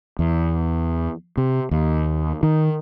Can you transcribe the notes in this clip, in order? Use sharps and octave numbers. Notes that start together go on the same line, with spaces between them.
E2
C3
D#2
D#3